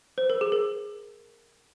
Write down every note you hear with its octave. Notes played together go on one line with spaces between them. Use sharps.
C5
A#4
G#4
A#4